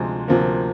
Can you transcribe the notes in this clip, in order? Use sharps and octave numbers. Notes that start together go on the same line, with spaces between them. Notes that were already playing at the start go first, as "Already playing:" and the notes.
Already playing: D2 C3 F3 G#3 C5
D2 C3 F3 A#3